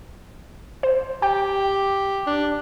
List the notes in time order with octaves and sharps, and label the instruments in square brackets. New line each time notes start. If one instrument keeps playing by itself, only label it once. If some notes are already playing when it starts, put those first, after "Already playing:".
[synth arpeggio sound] C5
[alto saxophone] G4 [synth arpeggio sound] G5
[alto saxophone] D4